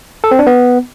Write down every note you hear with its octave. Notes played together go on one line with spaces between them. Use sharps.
A4
C4
D4
B3